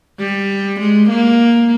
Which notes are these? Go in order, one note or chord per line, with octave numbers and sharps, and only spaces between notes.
G3
G#3
A#3